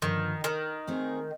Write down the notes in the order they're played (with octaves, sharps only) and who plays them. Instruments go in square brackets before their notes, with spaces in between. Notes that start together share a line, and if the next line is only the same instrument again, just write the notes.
[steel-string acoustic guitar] G2 D3 F3 [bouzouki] D#3
[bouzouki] D#3
[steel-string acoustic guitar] A3 C4 D#4 G#4 C5